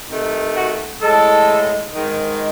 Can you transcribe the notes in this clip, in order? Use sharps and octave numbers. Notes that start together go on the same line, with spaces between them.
C3 D#3 A3
F#4
A2 G#3 A4
G#2 D#3 G#3